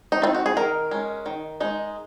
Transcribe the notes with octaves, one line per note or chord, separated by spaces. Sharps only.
D#4
C4 D#4 F4
F#4
G#4
D#3 A#4
G#3 C#4
D#3
G#3 D#4